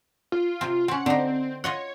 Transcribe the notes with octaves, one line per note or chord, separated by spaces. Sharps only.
F4
C3 C4
C4 C#4 F#5
D3 C4 D#4
F4 C#5 D#5 F#5